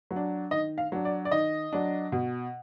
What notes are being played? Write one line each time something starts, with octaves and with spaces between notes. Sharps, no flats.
F#3
D4
D#3 D#5
F5
F#3 D4
D5
D5
D#3 D#5
F#3 D4
B2